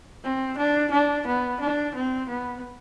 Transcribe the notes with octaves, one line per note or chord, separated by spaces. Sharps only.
C4
D4
D4
B3
D4
C4
B3